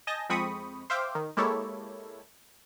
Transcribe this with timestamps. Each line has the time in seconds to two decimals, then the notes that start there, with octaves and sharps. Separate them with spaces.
0.07 D#5 G#5 A5 G6 A#6
0.29 F2 G#3 C4 B5 C#6 D#6
0.90 C5 E5 F5 G5 D6
1.15 D#3
1.37 G#3 A#3 E4 G4 A4 C#5